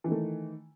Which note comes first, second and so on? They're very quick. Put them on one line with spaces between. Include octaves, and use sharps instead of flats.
E3 D#3 A3